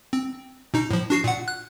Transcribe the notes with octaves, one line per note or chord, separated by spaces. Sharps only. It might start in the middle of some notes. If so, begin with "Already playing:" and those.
C4
B2 D#4
A2 F3
D4 F#4 C7
A#2 F#5
F#6